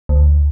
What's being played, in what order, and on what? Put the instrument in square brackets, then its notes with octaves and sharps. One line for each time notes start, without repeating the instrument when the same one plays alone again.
[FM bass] D2